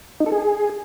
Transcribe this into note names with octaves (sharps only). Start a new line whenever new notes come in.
D#4
A4
G#4